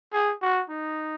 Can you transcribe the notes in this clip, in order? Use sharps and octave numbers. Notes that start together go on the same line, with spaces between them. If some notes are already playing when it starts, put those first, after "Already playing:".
G#4
F#4
D#4